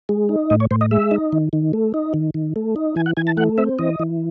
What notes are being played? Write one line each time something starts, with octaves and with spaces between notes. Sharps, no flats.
G#3
D#4
A2 D#5
C#5
A2 C5
D#5
G#3 E5
D#4
D#3
D#3
A3
D#4
D#3
D#3
A3
D#4
E3 G#5
F#5
E3 G#5
A5
A3 F#5
C4 E5
E3 D#5
E3